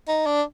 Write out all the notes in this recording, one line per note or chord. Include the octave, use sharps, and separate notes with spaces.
D#4
D4